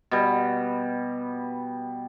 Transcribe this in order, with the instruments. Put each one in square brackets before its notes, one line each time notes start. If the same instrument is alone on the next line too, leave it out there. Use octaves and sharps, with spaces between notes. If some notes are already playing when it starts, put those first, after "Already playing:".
[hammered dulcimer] B2 G3